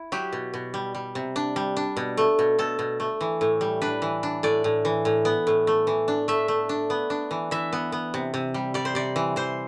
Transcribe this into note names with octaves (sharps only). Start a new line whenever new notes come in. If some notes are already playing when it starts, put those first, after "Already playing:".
Already playing: E4
F#3 G4
B2
B2
G3
G3
C3
D4
G3
D4
B2
A3
B2
B2 A4
B2
A3
E3
A2
G3
D4 B4
E3
D4
A2 D5
A2
E3
A2
B3
A2
A3
E3
D4
A3 E5
A3
D4
B3
D4
E3
E3 E5
B3
B3
C3
C3
G3
G3 D5
C5
C3 D5
E3
E3 C5